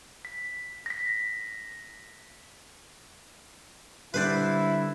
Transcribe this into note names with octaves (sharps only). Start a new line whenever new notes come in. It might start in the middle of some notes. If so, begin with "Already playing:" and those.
B6
A#6 B6
D3 G3 E4 B4 C5 D5